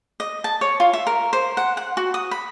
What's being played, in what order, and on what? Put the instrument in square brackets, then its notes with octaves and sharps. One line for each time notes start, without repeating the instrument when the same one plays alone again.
[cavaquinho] D#5
A5
C#5
F4
E5
A#4
C5
F#5
F#5
F#4
D#6
B5